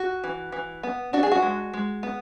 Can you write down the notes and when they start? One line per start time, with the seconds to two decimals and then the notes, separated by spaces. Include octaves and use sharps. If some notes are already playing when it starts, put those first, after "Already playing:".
Already playing: F#4
0.24 E3
0.52 E3
0.83 B3
1.13 D4 F#4
1.23 G#4
1.31 F#4
1.42 G#3
1.74 G#3
2.03 B3